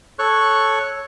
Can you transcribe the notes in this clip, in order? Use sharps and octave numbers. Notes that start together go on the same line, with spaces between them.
A4 C#5 C#6 F#6